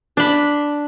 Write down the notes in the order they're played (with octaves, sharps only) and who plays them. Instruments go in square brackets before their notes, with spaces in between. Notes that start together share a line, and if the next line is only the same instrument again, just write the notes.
[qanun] D4 B5